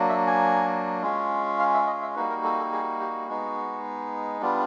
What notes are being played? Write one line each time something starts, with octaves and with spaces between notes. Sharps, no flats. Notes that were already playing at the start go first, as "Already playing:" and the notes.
Already playing: F#3 A#3 D4
E5
G#5
G#3 C#4 F4
F5
E5
D#5
E5
G3 A#3 D#4 F#4 B4
A#4
A4
A4
G#4
G4
G#3 B3 D#4 F#4
G3 B3 D4 F4